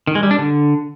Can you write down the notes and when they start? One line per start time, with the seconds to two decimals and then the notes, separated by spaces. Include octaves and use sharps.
0.07 D#3
0.15 G#3
0.23 G3
0.31 D4
0.39 D3